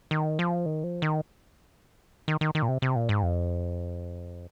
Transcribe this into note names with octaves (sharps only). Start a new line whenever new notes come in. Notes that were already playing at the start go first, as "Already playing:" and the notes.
D#3
F3
D#3
F3
D#3
D#3
D#3
D#3
A#2
C3
C3
A#2
G#2
F2